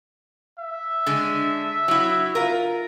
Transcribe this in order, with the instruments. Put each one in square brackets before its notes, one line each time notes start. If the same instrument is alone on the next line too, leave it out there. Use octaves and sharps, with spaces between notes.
[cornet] E5
[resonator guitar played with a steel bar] D3 G#3
F#3 E4
F4 A#4